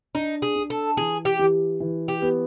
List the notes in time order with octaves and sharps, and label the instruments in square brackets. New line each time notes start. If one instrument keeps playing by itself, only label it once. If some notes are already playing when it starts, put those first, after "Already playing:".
[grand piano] D4 [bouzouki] D#4
[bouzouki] G#4
[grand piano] D4
[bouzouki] A4
[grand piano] E3 [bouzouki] G#4
[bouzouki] G4
[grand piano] E3
E3
[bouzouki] G4
[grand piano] B3